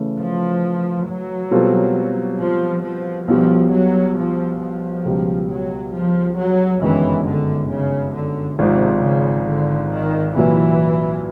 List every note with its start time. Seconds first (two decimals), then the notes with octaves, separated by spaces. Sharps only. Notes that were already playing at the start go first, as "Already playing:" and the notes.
Already playing: C#3 E3 A3
0.18 F3
1.08 F#3
1.51 B2 G3 C4 F4 A4
2.40 F3
2.83 F3
3.28 B1 B2 F3 G3
3.72 F#3
4.17 F3
4.60 F3
5.05 C#2 B2 G3
5.50 F#3
5.94 F3
6.38 F#3
6.82 G1 F#2 D#3 E3 G#3 C#4
7.26 D3
7.70 C#3
8.14 D3
8.59 G#1 G#2 C3 F3
9.03 C#3
9.48 D3
9.91 D#3
10.36 C2 A#2 E3 F#3